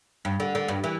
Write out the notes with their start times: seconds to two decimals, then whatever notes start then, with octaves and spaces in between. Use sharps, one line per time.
0.25 G2
0.40 D3
0.55 D3
0.68 G2
0.84 E3